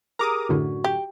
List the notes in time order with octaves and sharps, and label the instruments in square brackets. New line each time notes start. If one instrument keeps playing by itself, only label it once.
[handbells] G4 G#4 A#4 [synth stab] A#5 D6 D#6
[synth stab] F#2 A2 D3 [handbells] F#4
[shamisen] G4